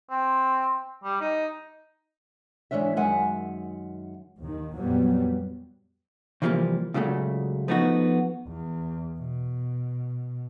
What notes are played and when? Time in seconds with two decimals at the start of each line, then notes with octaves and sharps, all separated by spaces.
0.10 C4
1.04 G3
1.21 D#4
2.71 G#2 D#3 E3 C#4 D4 E5
2.97 F#2 D#3 G#3 E5 F#5 G#5
4.40 D#2 D#3
4.76 F2 A#2 F#3 G3 B3
6.42 C3 E3 F3 G3 A3 A#3
6.94 C#2 A#2 C#3 F#3 A3
7.68 F3 A3 B3 D#4 F#4
8.48 E2
9.19 B2